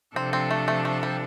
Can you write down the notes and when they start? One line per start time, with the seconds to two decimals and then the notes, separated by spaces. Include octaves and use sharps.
0.16 C3 F3 C4 D4 A4
0.33 C4
0.51 A3
0.68 A3
0.85 A3
1.03 G3